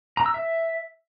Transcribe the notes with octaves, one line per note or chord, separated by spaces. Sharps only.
A#5
E6
E5